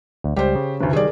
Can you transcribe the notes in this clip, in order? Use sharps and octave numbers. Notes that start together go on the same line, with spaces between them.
D2
C#2 G3 G4 C5
C#3
F1 D2
D#3 G3 G#4 A#4 D5